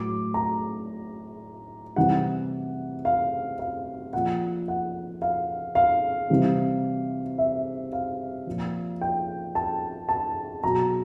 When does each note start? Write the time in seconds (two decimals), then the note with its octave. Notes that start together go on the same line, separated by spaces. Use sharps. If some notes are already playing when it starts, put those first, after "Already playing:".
Already playing: A2 F#3 D6
0.34 A#5
1.96 C3 E3 G3 F#5
3.05 F5
3.59 F5
4.13 A#2 F3 F#5
4.68 F#5
5.22 F5
5.75 F5
6.30 C3 E3 G3
7.38 E5
7.93 F5
8.47 A#2 F3
9.01 G5
9.55 A5
10.09 A5
10.64 B2 F#3 A#5